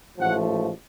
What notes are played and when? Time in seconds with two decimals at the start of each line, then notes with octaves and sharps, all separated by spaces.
0.18 A1 G#2 F3 A3 F#5